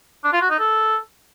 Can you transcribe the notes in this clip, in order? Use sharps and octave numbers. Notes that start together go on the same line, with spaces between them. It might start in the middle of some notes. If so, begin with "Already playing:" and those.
D4
F4
F#4
D#4
A4